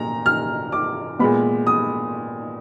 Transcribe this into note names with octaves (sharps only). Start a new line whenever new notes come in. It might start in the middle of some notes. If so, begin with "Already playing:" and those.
Already playing: A#2 A#5
F6
D6
A#2 G#3 B3 B5
D#6